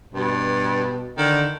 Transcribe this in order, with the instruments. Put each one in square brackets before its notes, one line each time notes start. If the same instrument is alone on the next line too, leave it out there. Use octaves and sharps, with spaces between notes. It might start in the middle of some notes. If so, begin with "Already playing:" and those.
[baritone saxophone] G2 [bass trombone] B2
[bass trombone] D3 [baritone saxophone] D#3